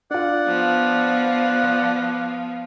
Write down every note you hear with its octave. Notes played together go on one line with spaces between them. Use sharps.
D4 F4 D5 F#5
F3 B3